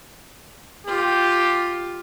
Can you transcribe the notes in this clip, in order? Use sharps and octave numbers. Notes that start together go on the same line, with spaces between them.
F4 G4